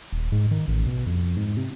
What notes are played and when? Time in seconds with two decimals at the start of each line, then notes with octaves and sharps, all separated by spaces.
0.12 D#1
0.32 G#2
0.51 D#3
0.68 A1
0.87 B2
1.06 F2
1.37 G#2
1.57 C3